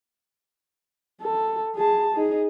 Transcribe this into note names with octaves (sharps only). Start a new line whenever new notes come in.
A4
G#4 A5
D#4 G#4